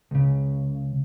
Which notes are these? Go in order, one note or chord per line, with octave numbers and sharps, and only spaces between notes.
C#2 C#3